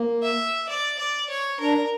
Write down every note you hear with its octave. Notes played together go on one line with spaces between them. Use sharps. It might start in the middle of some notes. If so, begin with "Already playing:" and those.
Already playing: A#3
E5
D5
D5
C#5
D4 A#4